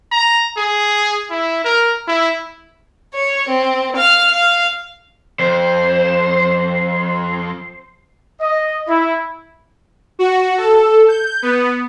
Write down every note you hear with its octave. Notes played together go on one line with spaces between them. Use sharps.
A#5
G#4
E4
A#4
E4
C#5
C4
F5 F6
F5
F2 C5
D#5
E4
F#4
A4
G6
B3